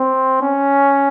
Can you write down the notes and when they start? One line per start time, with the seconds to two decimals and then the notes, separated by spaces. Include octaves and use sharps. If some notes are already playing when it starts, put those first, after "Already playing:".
Already playing: C4
0.42 C#4